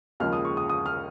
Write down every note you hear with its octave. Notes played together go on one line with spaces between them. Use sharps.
D#2 C#3 F3 G#3 F6
D#6
C#6
D#6
D#6
F6